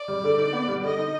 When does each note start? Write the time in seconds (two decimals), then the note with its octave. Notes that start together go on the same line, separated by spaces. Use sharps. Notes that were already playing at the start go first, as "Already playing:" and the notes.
Already playing: D5
0.08 G3
0.24 D3
0.38 D#4
0.53 B3
0.68 G3
0.84 D3 D#5
0.98 D#4